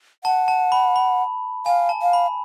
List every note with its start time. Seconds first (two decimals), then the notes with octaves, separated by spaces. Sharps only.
0.24 F#5 A5
0.48 A5
0.72 B5
0.96 B5
1.66 F5 G#5
1.89 A5
2.02 F5
2.13 B5